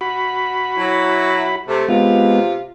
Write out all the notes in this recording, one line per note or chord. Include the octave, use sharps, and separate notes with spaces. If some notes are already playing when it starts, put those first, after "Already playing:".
F#4 B5
F#3 E4
C3 A3
C3 G#3 B3 F4